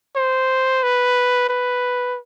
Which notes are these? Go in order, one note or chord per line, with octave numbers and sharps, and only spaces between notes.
C5
B4
B4